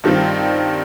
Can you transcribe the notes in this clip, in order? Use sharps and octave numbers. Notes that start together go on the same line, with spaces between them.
G2 D#3 G3 C4 F4